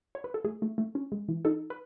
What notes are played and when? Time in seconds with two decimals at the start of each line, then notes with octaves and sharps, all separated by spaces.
0.15 C#5
0.24 B4
0.34 A4
0.44 A3 G#4
0.62 A3
0.78 A3
0.95 C#4
1.12 G#3
1.28 E3
1.45 D#4 A4
1.70 B4